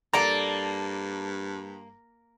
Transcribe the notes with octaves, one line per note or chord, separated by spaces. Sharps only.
G2 A#3 A4 D5 A5 A#5